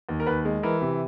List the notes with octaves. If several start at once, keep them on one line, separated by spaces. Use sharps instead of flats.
D#2
A#4
D#2 B4
G#3
E3 A#4
C3